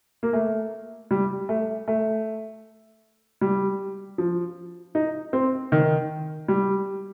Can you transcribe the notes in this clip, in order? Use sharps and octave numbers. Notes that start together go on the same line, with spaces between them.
A#3
A3
G3
A3
A3
G3
F3
D#4
C4
D#3
G3